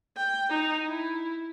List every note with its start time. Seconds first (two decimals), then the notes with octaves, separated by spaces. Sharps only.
0.17 G5
0.49 D#4
0.88 E4